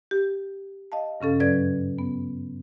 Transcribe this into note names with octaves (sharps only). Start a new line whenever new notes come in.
G4
D#5 F5 A5
G2 C#3 C#4 A4 F5
F#2 F#3 C#4 B4 D5 G#6
B3